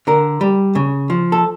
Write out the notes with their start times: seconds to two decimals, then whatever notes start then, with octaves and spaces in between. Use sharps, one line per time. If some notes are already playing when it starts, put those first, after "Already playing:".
0.07 D3 A#4
0.41 G3
0.75 C#3
1.10 F3
1.32 A4